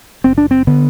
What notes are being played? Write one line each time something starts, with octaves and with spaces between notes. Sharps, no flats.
F#1 C4
D4
C4
D3 B3